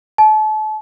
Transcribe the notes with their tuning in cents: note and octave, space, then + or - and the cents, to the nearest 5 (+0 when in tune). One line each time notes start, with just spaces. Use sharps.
A5 -35